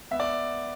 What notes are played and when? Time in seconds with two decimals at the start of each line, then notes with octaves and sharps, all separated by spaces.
0.11 B3 E5
0.20 D5